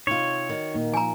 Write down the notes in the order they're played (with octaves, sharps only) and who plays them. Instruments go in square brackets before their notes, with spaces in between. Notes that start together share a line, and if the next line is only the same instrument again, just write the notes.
[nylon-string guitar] C3 F4 [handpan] D#4 [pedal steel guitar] C#5
[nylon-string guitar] D#3 F#4
[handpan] A#2 A#3 D#4
[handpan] F3 [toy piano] G#5 A#5